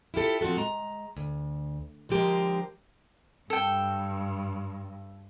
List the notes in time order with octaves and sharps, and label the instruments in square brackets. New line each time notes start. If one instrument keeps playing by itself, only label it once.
[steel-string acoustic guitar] E4 F4 G4 A4
F3 C4 F4 F#4 A4
G#3 A#5
D2
D3 F3 G#3 G4 A#4 C5
[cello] G2 [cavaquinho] A4 G5